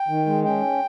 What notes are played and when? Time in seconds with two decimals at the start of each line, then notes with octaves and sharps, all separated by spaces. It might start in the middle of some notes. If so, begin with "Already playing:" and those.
Already playing: G5
0.08 D#3
0.26 G#3
0.44 C#4 G5